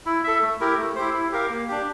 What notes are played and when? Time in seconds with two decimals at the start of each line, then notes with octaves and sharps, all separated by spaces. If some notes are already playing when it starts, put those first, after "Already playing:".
0.06 E4
0.24 A4 E5
0.42 A3
0.60 E4 G4 A#4
0.78 A3
0.96 E4 G4 C5
1.13 E4
1.32 G4 A#4 F5
1.50 A#3
1.68 D4 G4